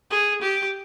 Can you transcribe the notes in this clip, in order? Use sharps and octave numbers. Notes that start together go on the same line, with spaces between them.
G#4
G4